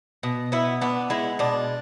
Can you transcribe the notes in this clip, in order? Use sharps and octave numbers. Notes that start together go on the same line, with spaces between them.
B2
B3 E4
B3 D4
G#3 E4
B2 D4